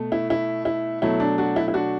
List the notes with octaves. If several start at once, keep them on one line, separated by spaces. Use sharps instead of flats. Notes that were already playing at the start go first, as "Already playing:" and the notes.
Already playing: B2 A3
E4
E4
E4
B2 F#3 A3 E4
D4
D4 F#4
E4
E4
D4 F#4